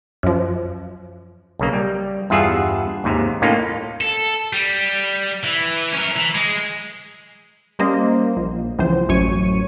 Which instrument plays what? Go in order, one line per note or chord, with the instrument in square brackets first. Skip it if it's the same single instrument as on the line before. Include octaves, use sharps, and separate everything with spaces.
[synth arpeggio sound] F#2 F3
[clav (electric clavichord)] B1 C#3 A#3
G3
E2 G2 F4 G#4 E5 F#5
D#2 G#2 C3
A2 A#3 C#4 D#4 F4
[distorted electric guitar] A4
G3
E3
C#4 A#4
E3
G#3
[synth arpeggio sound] G3 A#3 C#4 C5 D#5
A#1
C#2 E3 F3 C5
A1 F#2 F#3 C#5 C#6 D#7